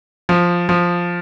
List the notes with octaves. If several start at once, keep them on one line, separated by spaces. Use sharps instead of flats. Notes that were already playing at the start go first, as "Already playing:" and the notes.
F3
F3